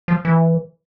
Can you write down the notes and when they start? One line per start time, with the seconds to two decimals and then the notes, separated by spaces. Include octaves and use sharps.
0.08 F3
0.25 E3